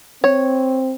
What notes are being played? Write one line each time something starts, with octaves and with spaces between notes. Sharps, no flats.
C4 C#5